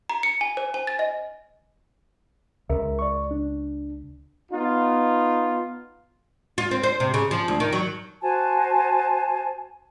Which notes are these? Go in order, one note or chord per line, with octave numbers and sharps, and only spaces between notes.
A#5
C#7
G#5
C5
G#5
A6
D#5
C#2 A#4 E5
D5 C#6
D4
B3 D#4 F4
F4
C4
C5
C3
C#3
F3
D2
D#3
F#3
F#4 C5 G#5 A5